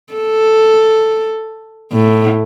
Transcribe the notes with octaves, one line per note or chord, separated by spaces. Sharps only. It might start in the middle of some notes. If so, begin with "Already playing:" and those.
A4
A2